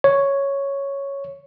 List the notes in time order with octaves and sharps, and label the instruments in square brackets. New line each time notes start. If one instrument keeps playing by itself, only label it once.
[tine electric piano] C#5